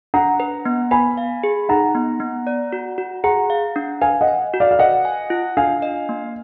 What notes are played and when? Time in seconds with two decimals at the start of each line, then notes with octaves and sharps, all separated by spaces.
0.14 D4 F#5 A#5
0.40 B4
0.65 B3
0.91 B4 G#5 B5
1.17 F5
1.43 G#4
1.69 D#4 F#5 A#5
1.95 B3
2.20 B3
2.47 D5
2.73 F#4
2.98 F#4
3.24 G#4 F#5 A#5
3.50 F5
3.76 D4
4.01 B4 F5 G#5
4.21 D#5 F#5
4.28 G#5
4.54 F#4
4.60 D5 F5
4.71 F5
4.79 B4 D#5 F#5
5.05 G#5
5.30 F4
5.57 D4 F5 G#5
5.82 D#5
6.09 A#3